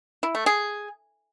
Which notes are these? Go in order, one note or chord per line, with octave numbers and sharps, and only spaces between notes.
E4
A3
G#4